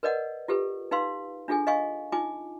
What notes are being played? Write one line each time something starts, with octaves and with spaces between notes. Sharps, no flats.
A#4 B4 D5 D#5 F#5
F4 G4 A4 B4
D#4 B4 F5 C6
D4 F4 G#4 A4 G#5
D#5 F5 G#5 C#6
D#4 F4 G#5 D6